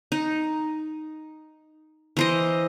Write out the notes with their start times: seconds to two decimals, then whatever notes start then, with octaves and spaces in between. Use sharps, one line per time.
0.12 D#4
2.17 E3 C5 D#5